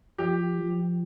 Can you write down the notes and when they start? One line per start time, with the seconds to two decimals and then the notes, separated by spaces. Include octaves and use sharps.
0.18 F3 G4
0.58 F3